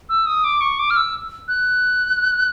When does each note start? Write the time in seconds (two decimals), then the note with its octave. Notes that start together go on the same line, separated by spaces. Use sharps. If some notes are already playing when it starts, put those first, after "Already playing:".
0.09 E6
0.26 D#6
0.44 D6
0.61 C#6
0.79 D6
0.90 F6
0.97 E6
1.48 F#6